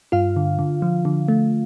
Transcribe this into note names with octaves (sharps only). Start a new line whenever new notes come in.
G2 F4 F5
D3
D3
F3
D3
A3